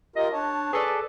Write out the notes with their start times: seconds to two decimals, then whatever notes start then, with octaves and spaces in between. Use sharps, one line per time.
0.16 F4 G4 A#4 D#5
0.33 D4 C#5 A5
0.73 G#4 A4 B4 D5